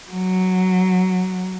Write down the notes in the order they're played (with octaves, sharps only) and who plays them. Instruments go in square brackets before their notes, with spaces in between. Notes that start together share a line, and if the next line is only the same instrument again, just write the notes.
[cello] F#3